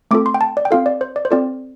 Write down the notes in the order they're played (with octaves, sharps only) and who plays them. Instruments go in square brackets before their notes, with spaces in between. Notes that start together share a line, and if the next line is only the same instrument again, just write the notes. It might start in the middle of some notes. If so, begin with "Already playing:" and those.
[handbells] A3 C4 F4 A4 D6
C6
G5
A5
D5
G5
C4 F4 A4 F5
D5
C5
D5
C5
C4 F4 A4 D5